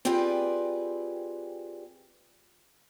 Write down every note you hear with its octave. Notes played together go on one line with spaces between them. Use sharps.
C4 F4 G4 G#4 B4 D5